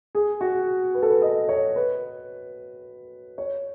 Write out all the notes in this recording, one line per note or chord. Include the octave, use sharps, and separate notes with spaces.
G#4
F#4
B4
A4
B4
D#5
C#5
B4
C#5